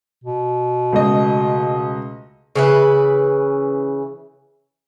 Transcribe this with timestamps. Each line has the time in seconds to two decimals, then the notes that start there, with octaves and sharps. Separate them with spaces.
0.24 B2
0.93 C#2 A3 D#5
2.55 C#3 E3 B4